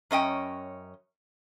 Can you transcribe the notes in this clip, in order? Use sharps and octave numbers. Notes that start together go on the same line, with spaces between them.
F#2 C#4 D#5 G5